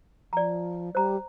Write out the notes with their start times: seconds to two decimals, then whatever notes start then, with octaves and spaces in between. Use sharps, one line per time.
0.33 F3 D5 A#5
0.95 G3 C5 A#5